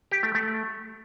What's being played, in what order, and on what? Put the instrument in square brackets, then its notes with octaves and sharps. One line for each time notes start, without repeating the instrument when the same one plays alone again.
[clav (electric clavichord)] G4
A3
A3